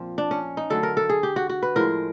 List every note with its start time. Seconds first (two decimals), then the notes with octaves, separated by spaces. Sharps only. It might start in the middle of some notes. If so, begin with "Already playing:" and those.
Already playing: A#2 F3 C4
0.18 D4
0.31 C#4
0.57 D#4
0.70 D3 F#3 A3 A4
0.83 A#4
0.97 A4
1.09 G#4
1.23 G4
1.36 F#4
1.49 F#4
1.63 B4
1.75 A2 F3 G#3 A#4